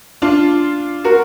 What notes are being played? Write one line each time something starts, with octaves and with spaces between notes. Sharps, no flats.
D4 F4
F#4 A#4